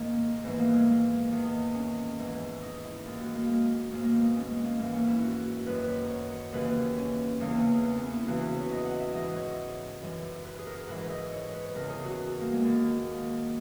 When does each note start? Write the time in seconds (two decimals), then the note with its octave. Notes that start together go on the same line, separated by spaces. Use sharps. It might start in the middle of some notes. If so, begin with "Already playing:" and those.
Already playing: G#2 D#3 A#3
0.44 G#2 E3 B3
0.58 A#3
0.73 G#3
0.88 A#3
1.31 E2 D#3
1.75 C#4
2.18 G#2 E3
2.62 D#4
2.83 E4
3.05 D#2 D#3
3.20 F#4
3.35 A#3
3.49 G#3
3.92 G#2 D#3 A#3
4.03 A#3
4.14 B3
4.25 D#4
4.36 C#4
4.50 G#3
4.64 A#3
4.79 G#2 E3 A#3
4.94 C#4
5.08 E4
5.23 F#4
5.66 F#2 D#3 B4
5.88 C#5
6.10 C#5
6.53 D#2 C#3 E3 B4
6.97 C#4
7.40 E2 C#3 E3 A#3
7.62 C#4
7.84 B3
7.98 C#4
8.13 E4
8.27 E2 C#3 E3 F#4
8.42 B4
8.56 C#5
8.71 D#5
8.85 F#5
9.00 E5
9.14 G#2 E3 D#5
9.36 C#5
10.01 F#2 E3
10.45 B4
10.58 G#4
10.67 A#4
10.88 G#2 E3 B4
11.10 D#5
11.32 C#5
11.47 C#5
11.53 B4
11.75 E2 C#3 E3 A#4
11.90 G#4
12.05 F#4
12.41 A#3
12.51 G#3
12.62 D#2 D#3